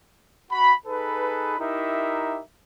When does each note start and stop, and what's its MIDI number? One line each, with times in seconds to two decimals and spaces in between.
0.50 0.73 66
0.50 0.73 83
0.85 1.56 63
0.85 1.56 68
0.85 1.56 69
0.85 1.56 71
1.59 2.40 63
1.59 2.40 64
1.59 2.40 67
1.59 2.40 70
1.59 2.40 76